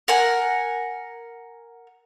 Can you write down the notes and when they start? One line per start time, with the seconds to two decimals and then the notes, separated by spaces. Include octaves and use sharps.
0.08 A#4 F#5 G#5